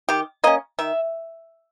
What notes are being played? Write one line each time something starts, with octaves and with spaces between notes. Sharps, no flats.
D#3 G4
A#3 C#4 D#5
D#3 E5